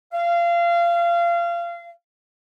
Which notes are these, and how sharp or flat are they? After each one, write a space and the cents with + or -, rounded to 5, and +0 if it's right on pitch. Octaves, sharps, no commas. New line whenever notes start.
F5 -25